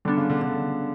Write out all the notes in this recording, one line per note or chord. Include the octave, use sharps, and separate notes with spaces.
D3 G3 B3 D4
C#3
D3
D3